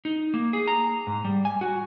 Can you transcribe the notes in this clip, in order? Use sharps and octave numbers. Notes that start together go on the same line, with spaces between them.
D#4
A#3
G#4
A#5
G#2
G3
G#5
F#4